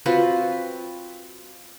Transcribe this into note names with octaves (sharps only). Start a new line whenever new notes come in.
C4 F4 F#4 B4